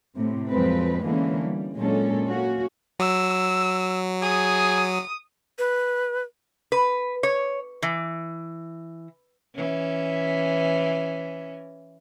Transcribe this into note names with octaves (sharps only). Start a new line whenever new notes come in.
A2 C3
F2 F3 F#3 G#3 C4 B4
D3 E3 G#3 A#3 B3 C#4
G3
A#2 F#3 G#3 C#4 D4 A4
A#3 C#4 F#4
F#3 E6
G#4 D#6
B4
B4
C#5
E3
E3 C#4